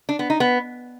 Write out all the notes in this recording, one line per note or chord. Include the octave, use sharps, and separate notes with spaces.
D4
B3
D#4
B3